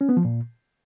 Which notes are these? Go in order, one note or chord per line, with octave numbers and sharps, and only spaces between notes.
C#4
B3
F3
A#2